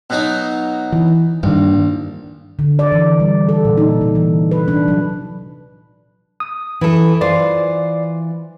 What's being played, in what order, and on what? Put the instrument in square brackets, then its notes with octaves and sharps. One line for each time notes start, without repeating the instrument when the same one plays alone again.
[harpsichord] B2 F#3 D#4
[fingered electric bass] E3
[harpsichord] A#1 [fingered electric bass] G2 D#3
[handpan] D3
D5
E3
G3
A4
A#2
D#4
C3
E3
B4
D4
F#3
[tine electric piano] D#6
[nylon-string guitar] E3 A4
[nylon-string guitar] E3 F4 C5 [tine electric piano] D5